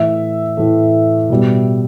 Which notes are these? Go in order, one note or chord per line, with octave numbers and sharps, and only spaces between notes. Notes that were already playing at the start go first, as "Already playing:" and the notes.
Already playing: A2 E3 A3 E5
A2 E3 A3
B2 G3